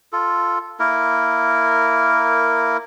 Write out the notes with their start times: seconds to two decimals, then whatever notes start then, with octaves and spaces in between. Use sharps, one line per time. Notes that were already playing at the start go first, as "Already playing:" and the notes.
0.13 F4 A4
0.79 A#3 E4 A#4